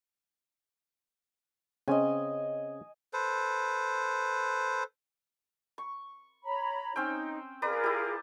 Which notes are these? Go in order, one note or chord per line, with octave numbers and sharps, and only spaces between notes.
C#3 C4 C#4 D#5 G#5
A4 B4 C5
C#6
C#5 A#5 B5
C4 C#4 D#4 G5
F4 G#4 A#4 B4 D5 A#5
E4 G4